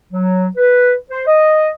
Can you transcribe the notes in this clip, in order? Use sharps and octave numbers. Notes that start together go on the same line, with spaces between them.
F#3
B4
C5
D#5